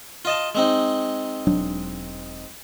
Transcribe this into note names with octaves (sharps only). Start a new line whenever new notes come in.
F4 D#5 A5
G#3 C4 D#4
E1 F#3 D4